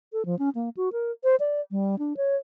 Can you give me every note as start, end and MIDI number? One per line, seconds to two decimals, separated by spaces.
0.13 0.25 69
0.26 0.38 53
0.39 0.49 61
0.55 0.69 58
0.77 0.89 66
0.93 1.11 70
1.24 1.36 72
1.40 1.61 74
1.71 1.98 55
1.99 2.16 62
2.17 2.36 73